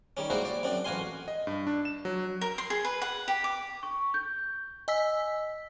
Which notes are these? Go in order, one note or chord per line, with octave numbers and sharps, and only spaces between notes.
D#3 G3 C#4
G3 G#3 A#3 E4 F#4 C5
D5
F#2 C4 D4
A1 F#4 F5 G#5 C6
D#5
G2
D4
E7
F#3
A#4
C6
G#4
B4
F#5
G4
D6
C#6
G6
D#5 G#5 E6 B6